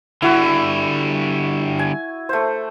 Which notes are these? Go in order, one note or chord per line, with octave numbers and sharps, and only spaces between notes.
D3 G3 E4 F#4
G#5
A3 C5